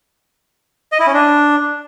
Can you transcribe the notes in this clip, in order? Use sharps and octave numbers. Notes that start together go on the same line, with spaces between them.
D#5
E4
C#4
D4